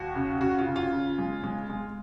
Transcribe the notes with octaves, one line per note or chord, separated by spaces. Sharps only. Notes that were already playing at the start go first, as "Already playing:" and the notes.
Already playing: D#2 F#4
C#3
C#3 F#4
F4
C#3
F4
C#3
G#3
G#3
G#3